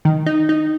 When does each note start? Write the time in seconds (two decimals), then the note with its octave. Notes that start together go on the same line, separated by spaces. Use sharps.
0.05 D#3
0.26 D#4
0.49 D#4